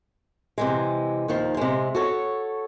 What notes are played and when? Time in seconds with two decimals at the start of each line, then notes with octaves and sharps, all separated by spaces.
0.58 C3 E3 G#3
1.28 D#2 D#3 F3
1.57 C3 G#3
1.95 F#4 A4 C#5